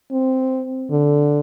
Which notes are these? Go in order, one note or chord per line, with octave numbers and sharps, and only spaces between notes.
C4
D3